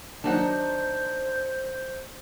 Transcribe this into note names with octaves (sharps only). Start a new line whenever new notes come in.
D#3 F#3 D4 D#4 C5 F#5